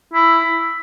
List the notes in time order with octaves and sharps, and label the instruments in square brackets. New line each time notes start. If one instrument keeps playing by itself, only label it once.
[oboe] E4